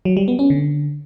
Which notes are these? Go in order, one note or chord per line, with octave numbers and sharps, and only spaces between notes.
F#3
G3
B3
C#4
D3